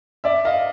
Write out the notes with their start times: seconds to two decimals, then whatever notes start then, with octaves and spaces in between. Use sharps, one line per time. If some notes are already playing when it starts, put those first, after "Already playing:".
0.24 D5 E5
0.45 D#5 F5